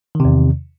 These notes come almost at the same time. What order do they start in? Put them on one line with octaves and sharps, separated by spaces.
D#3 C3 E2